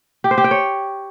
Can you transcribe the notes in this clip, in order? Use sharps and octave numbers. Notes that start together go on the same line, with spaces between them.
G4
C5
G4
G5
C#5